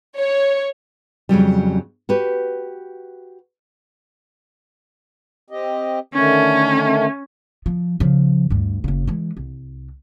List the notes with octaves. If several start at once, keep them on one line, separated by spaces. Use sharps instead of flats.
C#5
F2 C#3 F#3 G3
F#4 G4 B4
C4 G4 D#5
D3 D#3 A3 C#4
F3
C#3 F3
D2 G2
F#1 C#3
E3 G#3
C2